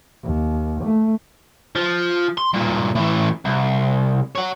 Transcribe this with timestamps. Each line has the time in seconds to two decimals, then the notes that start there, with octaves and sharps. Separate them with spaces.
0.24 D#2
0.84 A3
1.75 F3
2.38 C6
2.54 G2 A#2
2.95 A2 E3
3.45 C2
4.35 C#5 F#5